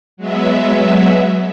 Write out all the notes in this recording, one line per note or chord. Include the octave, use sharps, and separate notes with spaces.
F#3 G#3 B3 E5